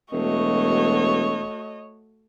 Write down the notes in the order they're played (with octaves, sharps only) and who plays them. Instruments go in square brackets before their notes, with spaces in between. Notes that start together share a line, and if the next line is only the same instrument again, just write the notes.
[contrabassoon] E1 [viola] A3 F#4 [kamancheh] C#5 D#5